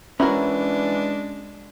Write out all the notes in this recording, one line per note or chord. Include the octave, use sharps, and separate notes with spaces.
E3 G#3 C#4 D4 E4 F#4 A#4 A#5